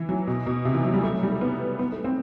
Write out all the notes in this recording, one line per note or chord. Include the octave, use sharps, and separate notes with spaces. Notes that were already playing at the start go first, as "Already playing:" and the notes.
Already playing: E3
F#3
B2
B2
C3
E3
F#3
G3
A3
F#3
G3
A3
B3
B3
A3
C4